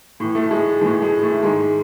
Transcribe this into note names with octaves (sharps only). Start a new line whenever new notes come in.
A2 E3
A3
G#3
A2 E3 G#3
G#3
A3
G#2 D#3 G#3